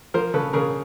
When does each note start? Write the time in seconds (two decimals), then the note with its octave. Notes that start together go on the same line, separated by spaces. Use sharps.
0.14 F3 A#4 C5
0.34 C#3 A4 B4
0.53 C#3 G#4 A#4